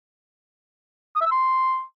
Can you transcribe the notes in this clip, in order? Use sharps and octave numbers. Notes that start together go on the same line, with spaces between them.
D#6
E5
E6
C6